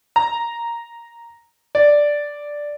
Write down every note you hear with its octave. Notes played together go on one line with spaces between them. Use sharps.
A#5
D5